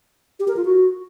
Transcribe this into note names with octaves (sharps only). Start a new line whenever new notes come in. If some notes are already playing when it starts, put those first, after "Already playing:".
G4
A#4
F4
F#4